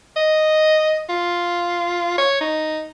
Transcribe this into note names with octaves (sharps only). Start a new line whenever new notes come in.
D#5
F4
C#5
D#4